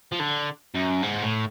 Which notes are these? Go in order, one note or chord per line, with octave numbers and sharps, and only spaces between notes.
F3
D3
F#2
G#2
A2